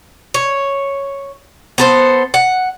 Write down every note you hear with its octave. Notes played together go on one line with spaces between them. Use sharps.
C#5
B3 A4 C5
F#5